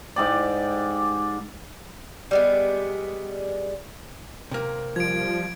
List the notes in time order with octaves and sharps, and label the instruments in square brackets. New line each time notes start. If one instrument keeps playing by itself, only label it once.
[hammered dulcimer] G#2 G4 D5
[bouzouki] G3 G#3 B3
[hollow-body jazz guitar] C3 A#3
[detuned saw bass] F3 [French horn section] G3 F4 [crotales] G#6 D7